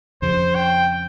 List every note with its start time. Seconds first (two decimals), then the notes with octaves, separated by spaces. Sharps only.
0.22 F2 C#3 F3 C5
0.55 G5